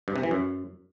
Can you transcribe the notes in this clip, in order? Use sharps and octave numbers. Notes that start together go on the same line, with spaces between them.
G2
C3
E3
F#2